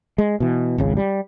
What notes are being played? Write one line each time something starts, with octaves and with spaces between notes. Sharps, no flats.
G#3
B2 E3
G#1 C#2 C#3
G3